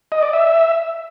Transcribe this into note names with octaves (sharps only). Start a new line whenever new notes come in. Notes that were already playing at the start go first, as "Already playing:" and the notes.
D#5
D5
E5